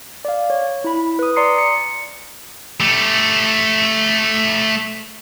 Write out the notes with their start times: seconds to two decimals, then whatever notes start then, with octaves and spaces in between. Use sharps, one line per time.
0.25 D5 F5
0.50 C#5
0.84 E4 B5
1.19 B4 D#6
1.36 D5 A#5 C6 D#6 C7 C#7
1.58 C#7
2.80 A3 G4